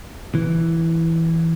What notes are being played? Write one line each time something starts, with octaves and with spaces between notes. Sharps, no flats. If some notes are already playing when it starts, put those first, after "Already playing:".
E3